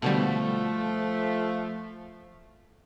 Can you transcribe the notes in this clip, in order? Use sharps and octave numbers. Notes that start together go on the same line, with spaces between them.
B2 D3 F3 G3 A3